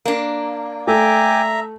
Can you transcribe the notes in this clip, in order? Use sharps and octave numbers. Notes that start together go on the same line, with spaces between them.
A#3 D4
A3 E5 G5 G#5 A#5 D6